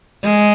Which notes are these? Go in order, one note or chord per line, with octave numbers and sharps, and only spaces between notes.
G#3